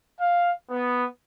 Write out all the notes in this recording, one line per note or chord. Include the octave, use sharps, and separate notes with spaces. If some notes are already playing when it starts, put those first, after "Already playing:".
F5
B3